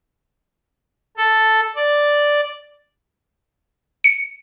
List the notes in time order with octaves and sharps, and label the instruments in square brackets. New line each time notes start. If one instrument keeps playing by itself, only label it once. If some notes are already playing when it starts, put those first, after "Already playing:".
[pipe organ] A4
D5
[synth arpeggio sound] C#7